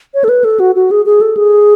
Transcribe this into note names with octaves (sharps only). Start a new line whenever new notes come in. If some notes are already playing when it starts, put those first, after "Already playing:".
C#5
A4
B4
A4
F#4
F#4
G#4
G#4
A4
G#4